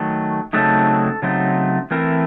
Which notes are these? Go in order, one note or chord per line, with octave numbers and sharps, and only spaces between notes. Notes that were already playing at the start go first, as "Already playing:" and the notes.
Already playing: D#3 F#3 A3
C#3 F#3 A3 C4 D#4 A4
C#3 F#3 A3 C4 D#4
E3 A3 C4 E4 A#4